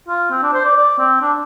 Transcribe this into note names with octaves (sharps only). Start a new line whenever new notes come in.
F4
C4
D4
C5
D5
D5
C4
D4